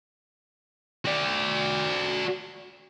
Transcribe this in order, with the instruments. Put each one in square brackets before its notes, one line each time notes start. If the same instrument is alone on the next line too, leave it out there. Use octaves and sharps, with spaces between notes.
[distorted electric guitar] F#4 D5